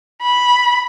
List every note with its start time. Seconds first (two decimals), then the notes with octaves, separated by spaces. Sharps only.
0.22 B5